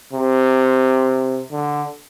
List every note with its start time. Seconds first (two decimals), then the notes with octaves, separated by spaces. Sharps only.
0.13 C3
1.51 D3